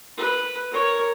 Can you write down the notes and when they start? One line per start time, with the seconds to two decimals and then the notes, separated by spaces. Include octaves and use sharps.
0.17 B4
0.71 A#4 C#5